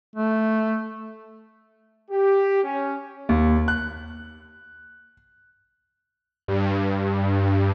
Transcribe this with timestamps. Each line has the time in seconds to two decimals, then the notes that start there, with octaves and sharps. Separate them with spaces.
0.16 A3
2.11 G4
2.64 C#4
3.29 D#2
3.68 F#6
6.48 G2